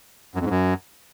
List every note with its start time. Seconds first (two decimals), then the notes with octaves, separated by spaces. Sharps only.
0.35 F#2
0.40 F2
0.45 G#2
0.50 F#2